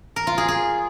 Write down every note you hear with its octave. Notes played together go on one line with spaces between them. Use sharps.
A#4
F4
G#4
G#4